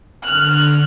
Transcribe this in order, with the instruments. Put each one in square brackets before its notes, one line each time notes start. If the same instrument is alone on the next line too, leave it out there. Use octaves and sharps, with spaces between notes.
[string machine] D3 [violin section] F6 F#6